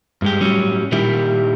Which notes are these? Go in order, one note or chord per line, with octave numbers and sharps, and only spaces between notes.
G2 G#3 G4
A2 F#3 G3 C#4
A#2 D#3 G3 E4 G4